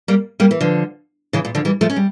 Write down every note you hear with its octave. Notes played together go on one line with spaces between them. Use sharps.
G3 A#3
G3 A#3
E3
D3 F3
C#3 E3
A#2
D3 F3
E3 G3
F3 A3
C#4
G3